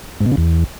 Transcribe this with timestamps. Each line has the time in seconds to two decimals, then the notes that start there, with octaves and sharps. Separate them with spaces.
0.20 G#2
0.26 B2
0.32 C#3
0.37 E2